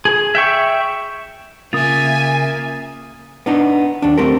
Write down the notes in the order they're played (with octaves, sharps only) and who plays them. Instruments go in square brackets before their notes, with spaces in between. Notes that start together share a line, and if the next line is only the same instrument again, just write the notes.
[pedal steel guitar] G#4
E5 G5 C#6
[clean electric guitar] C#3 F4 [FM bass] A#3 [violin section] E5 G#5 [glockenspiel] D#6 A6
[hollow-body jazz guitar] B3 D4 D#4
D#2 D4
A3 C4 G4 A#4